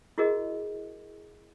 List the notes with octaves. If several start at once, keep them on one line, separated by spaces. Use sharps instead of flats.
E4 F#4 G#4 A#4 D#5